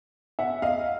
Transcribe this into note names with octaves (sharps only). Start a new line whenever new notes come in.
E5 F#5
D#5 F5